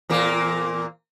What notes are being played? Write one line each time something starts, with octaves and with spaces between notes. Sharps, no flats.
E2 A#2 A#3